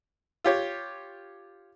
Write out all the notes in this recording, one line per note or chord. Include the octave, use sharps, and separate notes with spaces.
F4 G4 C#5